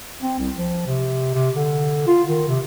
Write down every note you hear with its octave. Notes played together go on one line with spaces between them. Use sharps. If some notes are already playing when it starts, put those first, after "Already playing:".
C4
C2
F3
C3
C3
D3
F4
D#3
C3